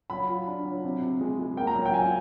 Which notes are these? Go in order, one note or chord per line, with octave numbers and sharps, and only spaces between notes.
F#3 B5
F4
D4
F#3
C3
C3
G#3
G#3
A#3 G5
A#5
F#3
G5
F4 G#5